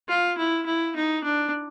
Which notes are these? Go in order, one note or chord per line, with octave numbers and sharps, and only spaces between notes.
F4
E4
E4
D#4
D4